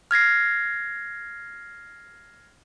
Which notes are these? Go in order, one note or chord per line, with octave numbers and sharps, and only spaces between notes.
F6 G#6 A#6 C7